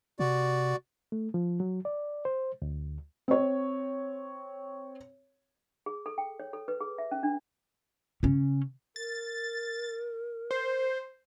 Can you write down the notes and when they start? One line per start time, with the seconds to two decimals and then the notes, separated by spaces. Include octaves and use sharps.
0.19 C3 F#4 D5
1.12 A3
1.34 F3
1.60 F#3
1.85 D5
2.25 C5
2.62 D2
3.28 C4 C#5
5.86 G#4
6.06 A4
6.18 G5
6.40 C#5
6.53 A4
6.68 B4
6.81 G#4
6.98 E5
7.11 C#4
7.23 D4
8.23 C#3 C#4
8.96 A#4 A6
10.51 C5